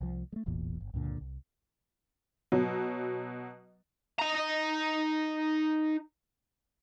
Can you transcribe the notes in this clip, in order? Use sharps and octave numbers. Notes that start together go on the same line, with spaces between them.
C2 F3
G#3 A3
E1 A1 E2 A#2
G1
C#2 G2 A#2 D3
C2
B2 F#3
D#4 A#5